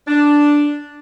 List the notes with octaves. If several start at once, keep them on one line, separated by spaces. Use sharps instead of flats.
D4